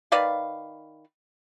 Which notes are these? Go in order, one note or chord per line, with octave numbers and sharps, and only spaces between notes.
D#3 B4 D5 F5